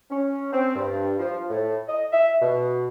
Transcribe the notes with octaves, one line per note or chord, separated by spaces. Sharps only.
C#4
C4
G2
F3
A2
D#5
E5
B2